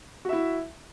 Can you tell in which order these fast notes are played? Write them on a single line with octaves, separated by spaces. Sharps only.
F#4 E5 E4